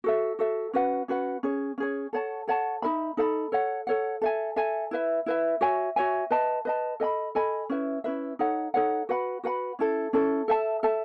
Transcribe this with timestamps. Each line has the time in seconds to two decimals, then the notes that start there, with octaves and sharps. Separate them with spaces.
0.04 F#4 A4 E5
0.39 F#4 A4 E5
0.73 C#4 F#4 B4 F#5
1.08 C#4 F#4 B4 F#5
1.43 C#4 G#4 C#5
1.78 C#4 G#4 C#5
2.13 A4 C#5 F#5 A5
2.48 A4 C#5 F#5 A5
2.82 D#4 A4 E5 B5
3.17 D#4 A4 E5 B5
3.52 A4 C#5 F#5
3.87 A4 C#5 F#5
4.22 A4 E5 G#5
4.56 A4 E5 G#5
4.91 E4 B4 E5
5.26 E4 B4 E5
5.61 F#4 C#5 E5 G#5
5.96 F#4 C#5 E5 G#5
6.31 B4 D#5 A5
6.65 B4 D#5 A5
7.00 A4 D#5 G#5 B5
7.35 A4 D#5 G#5 B5
7.70 C#4 E4 B4 E5
8.04 C#4 E4 B4 E5
8.39 D#4 A4 C#5 F#5
8.74 D#4 A4 C#5 F#5
9.09 F#4 B4 F#5 B5
9.44 F#4 B4 F#5 B5
9.79 C#4 E4 A4
10.13 C#4 E4 A4
10.48 A4 E5 A5
10.83 A4 E5 A5